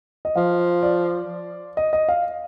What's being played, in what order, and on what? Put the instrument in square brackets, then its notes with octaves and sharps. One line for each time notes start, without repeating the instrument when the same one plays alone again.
[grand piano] D#5
[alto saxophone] F3 [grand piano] F5
[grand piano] D5
D#5
D#5
F5